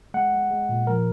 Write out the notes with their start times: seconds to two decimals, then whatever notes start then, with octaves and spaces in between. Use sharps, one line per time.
0.14 G#3 F#5
0.33 G#3
0.51 G#3
0.69 A#2
0.87 F3 A#4